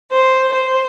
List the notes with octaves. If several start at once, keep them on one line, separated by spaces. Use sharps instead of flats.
C5
C5